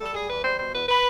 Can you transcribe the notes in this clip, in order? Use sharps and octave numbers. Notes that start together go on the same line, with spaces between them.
G3 A4
G3 G#4
E2 B4
G3 C5
B2 C5
E2 B4
B4